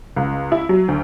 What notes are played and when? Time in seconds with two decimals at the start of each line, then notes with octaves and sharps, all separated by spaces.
0.16 C#2
0.52 E4
0.69 F#3
0.88 D2